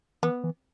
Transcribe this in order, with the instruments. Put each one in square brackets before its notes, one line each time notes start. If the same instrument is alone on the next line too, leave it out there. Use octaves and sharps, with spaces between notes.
[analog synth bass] E3 [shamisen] B3
[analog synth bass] E3